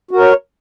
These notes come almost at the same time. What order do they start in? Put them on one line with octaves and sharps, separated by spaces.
F#4 A#4 C#5